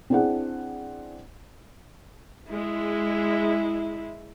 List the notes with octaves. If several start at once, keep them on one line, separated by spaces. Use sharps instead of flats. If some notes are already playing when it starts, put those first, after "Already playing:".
C4 D4 E4 G#4 D5 F#5
G#3 E4